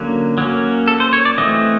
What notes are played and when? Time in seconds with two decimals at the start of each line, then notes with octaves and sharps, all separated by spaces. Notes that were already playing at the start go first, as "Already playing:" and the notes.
Already playing: D3 F#3 A#3 C#4
0.38 F#3 A#3 C#4
0.88 A4
1.00 C5
1.13 C#5
1.25 D5
1.38 E3 A3 C4 D#5